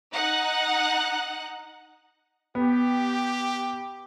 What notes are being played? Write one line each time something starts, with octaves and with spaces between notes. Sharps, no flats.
D#4 F#5 F#6
B3 G4